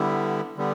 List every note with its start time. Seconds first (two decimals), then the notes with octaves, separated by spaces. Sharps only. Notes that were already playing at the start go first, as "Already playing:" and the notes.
Already playing: D3 G3 B3 E4
0.57 D3 G3 B3